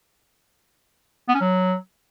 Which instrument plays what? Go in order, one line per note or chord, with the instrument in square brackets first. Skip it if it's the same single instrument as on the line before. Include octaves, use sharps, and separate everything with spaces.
[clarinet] B3
C#4
F#3